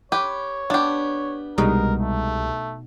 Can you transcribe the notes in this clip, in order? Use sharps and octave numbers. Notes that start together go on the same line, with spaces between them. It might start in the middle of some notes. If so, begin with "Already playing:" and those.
G4 B4 C#5
B3 D4 G4
C2 B2 G3 G#3 D#4 A#4
A3